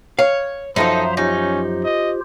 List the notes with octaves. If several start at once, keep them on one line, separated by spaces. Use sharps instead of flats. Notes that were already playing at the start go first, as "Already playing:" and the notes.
C#5 F5
F#2 F3 D#4 A4 C5 E5 A#5
C#4 D#4 F4 G4 C5
D#5